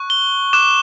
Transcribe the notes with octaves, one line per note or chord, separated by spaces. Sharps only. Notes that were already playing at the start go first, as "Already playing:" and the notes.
Already playing: C#6 F#6
G7
D6 F#6 E7